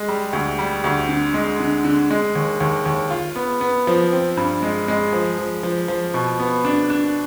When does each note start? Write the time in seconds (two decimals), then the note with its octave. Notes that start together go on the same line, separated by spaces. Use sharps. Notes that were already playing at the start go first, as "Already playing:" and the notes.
Already playing: G#3
0.08 G3
0.33 D2
0.59 G3
0.84 D2
1.09 D3
1.34 G#3
1.60 D3
1.84 D3
2.11 G#3
2.35 D#2
2.60 D#2
2.86 D#2
3.10 F4
3.36 B3
3.61 B3
3.87 F3
4.12 C4
4.37 G2
4.63 G#3
4.88 G#3
5.13 F3
5.38 F3
5.63 F3
5.88 F3
6.14 B2
6.39 B3
6.65 D4
6.90 D4